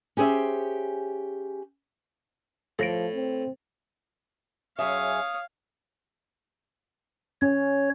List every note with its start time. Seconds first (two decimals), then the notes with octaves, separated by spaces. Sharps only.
0.17 C#4 G4 G#4 C5 E5
2.79 A2 F3 A4 A#6 D7
3.15 C4
4.79 F#2 G#4 C#5 E5 F5 D#6
7.42 C#4 C#5